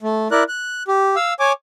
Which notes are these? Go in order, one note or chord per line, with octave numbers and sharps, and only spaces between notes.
A3
E4 A#4 D5 F#6
F#6
G4
F5 E6
C#5 G#5 D6